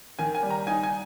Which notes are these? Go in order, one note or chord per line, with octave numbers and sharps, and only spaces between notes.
D#3 G#5
G#5
G3
A#5
D#4 G#5
G#5